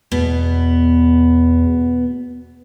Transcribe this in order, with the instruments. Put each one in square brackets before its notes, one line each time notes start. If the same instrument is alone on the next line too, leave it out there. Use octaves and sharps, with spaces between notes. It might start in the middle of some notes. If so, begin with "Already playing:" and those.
[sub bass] E2 [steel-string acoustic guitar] B2 B3